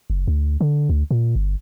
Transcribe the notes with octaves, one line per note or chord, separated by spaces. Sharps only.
F#1
D2
D3
D2
A#2
G1